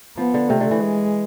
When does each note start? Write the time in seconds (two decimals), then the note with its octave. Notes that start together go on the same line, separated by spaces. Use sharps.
0.18 F3 B3
0.34 D3
0.49 C3 A3
0.60 D3
0.71 E3
0.81 G#3